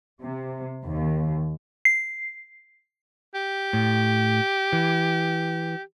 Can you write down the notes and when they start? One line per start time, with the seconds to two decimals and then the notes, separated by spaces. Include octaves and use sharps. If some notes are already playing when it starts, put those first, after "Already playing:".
0.22 C3
0.85 D#2
1.85 C7
3.34 G4
3.73 A2
4.73 E3